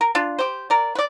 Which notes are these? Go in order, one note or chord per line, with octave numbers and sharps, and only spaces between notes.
A#4
D4 F4
G4 C5
A#4 D5
B4 D5